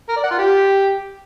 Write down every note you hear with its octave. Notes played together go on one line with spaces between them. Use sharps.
A#4
D5
F#5
F4
G4